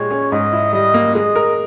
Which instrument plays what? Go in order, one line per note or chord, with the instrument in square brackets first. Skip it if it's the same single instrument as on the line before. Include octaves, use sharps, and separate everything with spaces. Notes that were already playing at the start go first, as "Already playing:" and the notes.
Already playing: [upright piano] A#2 G#3 G4 [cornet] C#5
[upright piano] C#4
[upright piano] G#2 [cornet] D#5
[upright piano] E4
[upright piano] G3 [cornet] D#5
[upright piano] A#3
[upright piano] G#3 [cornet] D#5
[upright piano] A#4